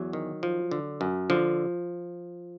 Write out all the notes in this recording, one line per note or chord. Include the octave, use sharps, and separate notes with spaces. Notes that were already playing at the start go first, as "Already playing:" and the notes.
Already playing: E2 F#3
D#3
F3
D3
F#2
D3 F3